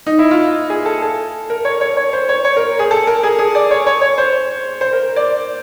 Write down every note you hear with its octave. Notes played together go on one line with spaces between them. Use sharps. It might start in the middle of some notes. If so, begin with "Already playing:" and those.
D#4
E4
F4
G#4
A4
A4
A#4
C#5
C#5
C#5
C5
C#5
C#5
A#4
G#4
A4
A#4
G#4
G#4
D5
C#5
C#5
C#5
C5
C5
A#4
D5